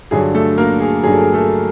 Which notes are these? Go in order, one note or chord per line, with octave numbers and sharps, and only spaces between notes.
G2 D3 F#3 G#4
A3 A4
A#3 A#4
G#4
G2 D3 F#3 G#4
A4
G#4
A3 A4